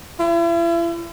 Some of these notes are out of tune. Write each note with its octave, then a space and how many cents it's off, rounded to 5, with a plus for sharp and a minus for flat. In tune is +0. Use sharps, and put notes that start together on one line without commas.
E4 +40